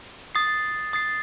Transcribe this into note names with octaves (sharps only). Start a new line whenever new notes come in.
D#6 A6 C7
D#6 A6 C7